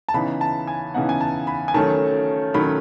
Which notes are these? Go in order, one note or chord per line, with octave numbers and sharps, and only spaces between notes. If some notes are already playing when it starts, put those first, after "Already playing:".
A5
C#3 E3 B3 D#4 B5
A5
G#5
C#3 E3 B3 D#4 F#5
G#5
A5
B5
G#5
D#3 F#3 A3 C#4 A5
D#3 F#3 A3 C#4 B5